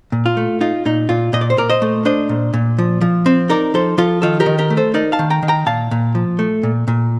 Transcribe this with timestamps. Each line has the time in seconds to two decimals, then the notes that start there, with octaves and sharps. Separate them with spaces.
0.12 A#2
0.26 F4
0.37 A3
0.61 D#4 F4
0.86 A#2 D#4
1.09 A#2 F4
1.33 A#2 D#5
1.41 D5
1.50 C5
1.57 A#2 A#4 D5
1.70 C5 D#5
1.82 A3
2.05 D4 C5 D#5
2.29 A#2
2.54 A#2
2.78 F3
3.01 F3
3.26 C4
3.50 D#4 A#4 D5
3.74 F3 A4 C5
3.98 F3 F4 A4
4.22 D#3 F4 A4
4.40 G4 A#4
4.46 D#3
4.59 G4 A#4
4.70 A3
4.77 A4 C5
4.94 D#4 A#4 D5
5.12 F5 A5
5.19 D#3
5.30 G5 A#5
5.43 D#3
5.48 G5 A#5
5.66 A#2 F5 A5
5.91 A#2
6.15 F3
6.39 A3
6.63 A#2
6.88 A#2